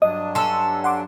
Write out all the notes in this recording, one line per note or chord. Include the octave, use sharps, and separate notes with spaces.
G2 F#3 D4 D#5 D#6
C#4 A4 C6 E6
F#5 C6 D6